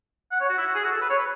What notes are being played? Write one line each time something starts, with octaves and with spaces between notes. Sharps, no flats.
F#5
C#5
F#4
E4
F#4
G#4
F#4
A4
B4
C#5
B4